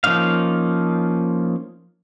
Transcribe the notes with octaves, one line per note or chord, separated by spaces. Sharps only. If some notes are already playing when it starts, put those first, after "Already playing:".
F3 A#3 C#4 D#4 F5